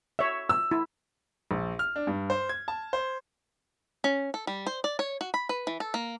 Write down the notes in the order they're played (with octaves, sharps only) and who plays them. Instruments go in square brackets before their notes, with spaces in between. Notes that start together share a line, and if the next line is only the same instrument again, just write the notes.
[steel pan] C#5 E5
[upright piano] E6
[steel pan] E4
[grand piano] A#1
F6
D4
G2
C5
G#6
A5
C5
[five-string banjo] C#4
A4
G3
C5
D5
C#5
F#4
B5
B4
E3
A4
A#3